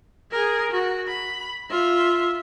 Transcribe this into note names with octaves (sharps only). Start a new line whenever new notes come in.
G#4 A#4
F#4
B5
F4 E5